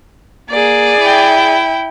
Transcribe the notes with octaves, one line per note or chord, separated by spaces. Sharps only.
A#3 G#4 D5
E4 G5